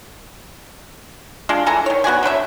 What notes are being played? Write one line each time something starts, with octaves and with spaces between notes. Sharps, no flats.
G#3 D4 F4
E3 A4 G#5 A#5
D#3 C#5
B3 F#4 D5 G#5
D3 F#3 B4 E5